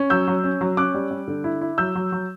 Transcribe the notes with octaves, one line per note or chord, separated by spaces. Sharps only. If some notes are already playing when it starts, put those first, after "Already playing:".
Already playing: C#4
F#3 E6 G6
F#3
C#4
F#3
C#4 D6 F#6
G3
G3
D3
E4
E4
F#3 E6 G6
F#3
F#3